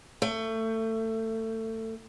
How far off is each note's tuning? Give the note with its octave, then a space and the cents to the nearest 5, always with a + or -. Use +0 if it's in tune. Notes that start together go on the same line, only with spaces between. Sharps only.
A3 +25